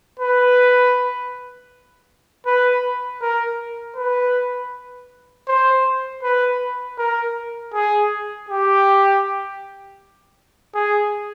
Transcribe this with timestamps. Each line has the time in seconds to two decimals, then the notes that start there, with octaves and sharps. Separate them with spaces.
0.20 B4
2.46 B4
3.21 A#4
3.97 B4
5.48 C5
6.23 B4
6.98 A#4
7.74 G#4
8.49 G4
10.75 G#4